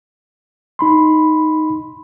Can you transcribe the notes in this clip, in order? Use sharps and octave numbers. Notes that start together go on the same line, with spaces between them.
D#4 B5 C6